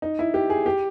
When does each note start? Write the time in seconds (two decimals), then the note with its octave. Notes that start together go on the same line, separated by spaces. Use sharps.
0.02 D#4
0.19 E4
0.34 G4
0.50 G#4
0.66 G4